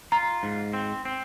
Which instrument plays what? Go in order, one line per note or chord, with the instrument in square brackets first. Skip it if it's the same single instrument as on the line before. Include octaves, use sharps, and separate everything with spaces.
[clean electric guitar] F4 [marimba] A#5
[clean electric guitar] G#2
C4
C4